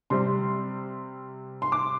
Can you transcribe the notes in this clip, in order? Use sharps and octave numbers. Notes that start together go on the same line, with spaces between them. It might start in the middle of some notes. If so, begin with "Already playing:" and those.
C3 G3 C4 C6
C6
D6